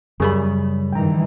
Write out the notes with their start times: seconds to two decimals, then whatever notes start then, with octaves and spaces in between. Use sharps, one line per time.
0.20 F#2 C#3 G3 G4 G#4 A#4 B5
0.92 G2 D#3 E3 G5 A#5